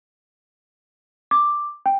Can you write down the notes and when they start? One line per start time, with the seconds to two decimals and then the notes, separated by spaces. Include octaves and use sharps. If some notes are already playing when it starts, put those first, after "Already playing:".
1.31 D6
1.86 G5